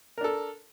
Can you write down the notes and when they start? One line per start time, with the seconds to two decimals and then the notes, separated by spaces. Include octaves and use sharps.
0.18 A#4
0.21 D4
0.24 A4